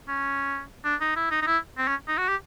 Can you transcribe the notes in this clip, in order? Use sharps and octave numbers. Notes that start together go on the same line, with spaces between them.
C#4
D4
D#4
E4
D#4
D#4
E4
C4
C#4
D#4
F#4
G4